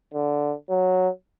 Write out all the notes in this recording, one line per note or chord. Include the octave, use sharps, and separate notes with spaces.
D3
F#3